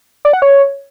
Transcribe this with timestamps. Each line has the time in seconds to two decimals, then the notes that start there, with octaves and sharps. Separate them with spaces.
0.25 D5
0.33 F#5
0.42 C#5